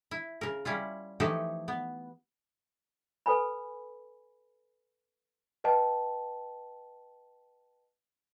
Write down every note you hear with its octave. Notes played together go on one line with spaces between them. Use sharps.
E4
C#3 A#4
G3 C#4 E4 F4
E3 F3 A3 D#4 G4 A4
B3
A4 B4 G#5 B5
B4 D#5 G5 A5